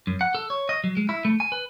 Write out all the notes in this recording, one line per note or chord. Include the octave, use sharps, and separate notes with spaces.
F#2
F#5
A4
C#5
D#5
F#3
G#3
E4
A3
G#5
B4